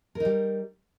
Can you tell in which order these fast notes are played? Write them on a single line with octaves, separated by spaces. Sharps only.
A#4 D#4 G3